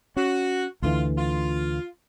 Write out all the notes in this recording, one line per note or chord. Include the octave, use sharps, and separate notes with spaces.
C#4 F#4
D2 D3 E3 F4
F4